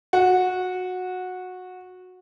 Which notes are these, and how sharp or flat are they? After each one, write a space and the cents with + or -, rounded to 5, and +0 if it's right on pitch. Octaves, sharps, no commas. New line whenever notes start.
F#4 -15